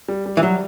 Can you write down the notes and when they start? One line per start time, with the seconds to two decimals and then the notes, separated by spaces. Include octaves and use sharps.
0.09 G3
0.26 G3
0.37 E3
0.43 F#3 G3